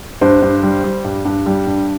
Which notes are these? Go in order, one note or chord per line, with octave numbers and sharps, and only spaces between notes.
G2 C5
G2
G3
G3
G2
G2
G3
G2